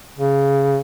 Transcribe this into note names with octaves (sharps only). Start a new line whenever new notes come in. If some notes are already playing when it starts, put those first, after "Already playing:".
C#3